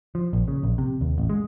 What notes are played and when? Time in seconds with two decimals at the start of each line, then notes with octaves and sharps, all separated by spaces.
0.15 F3
0.33 A#1
0.48 C#3
0.63 A#1
0.78 C3
1.01 D#2
1.18 A1
1.30 G#3